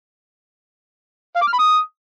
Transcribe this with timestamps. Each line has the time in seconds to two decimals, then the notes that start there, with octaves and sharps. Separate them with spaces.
1.36 F5
1.42 D6
1.47 F6
1.53 B5
1.59 D#6